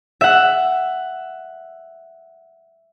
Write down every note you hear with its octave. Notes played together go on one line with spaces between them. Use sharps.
E5 F#5